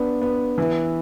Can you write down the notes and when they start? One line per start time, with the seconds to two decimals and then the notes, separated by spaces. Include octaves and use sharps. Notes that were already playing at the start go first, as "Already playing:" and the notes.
Already playing: B3 D4
0.22 B3
0.58 E3